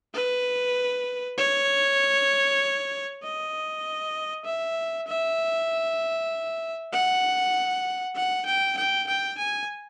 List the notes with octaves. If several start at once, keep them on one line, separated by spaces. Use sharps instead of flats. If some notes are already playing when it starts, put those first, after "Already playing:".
B4
C#5
D#5
E5
E5
F#5
F#5
G5
G5
G5
G#5